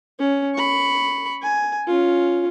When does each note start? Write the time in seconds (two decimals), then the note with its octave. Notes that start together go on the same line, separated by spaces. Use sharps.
0.19 C#4
0.55 B5 C#6
1.43 G#5
1.87 C#4 F4